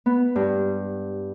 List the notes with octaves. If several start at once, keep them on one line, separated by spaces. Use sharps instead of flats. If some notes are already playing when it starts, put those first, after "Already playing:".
B3
G2